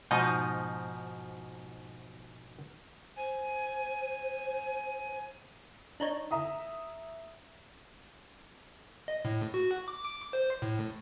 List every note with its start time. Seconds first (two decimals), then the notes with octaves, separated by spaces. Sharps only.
0.11 G#2 B2 F3 D#4 D#5
3.16 C5 G#5
6.00 D4 D#4 C#5
6.31 E5 A#5 D#6
9.08 D#5
9.25 A2
9.54 F#4
9.88 D6
10.33 C5
10.62 A2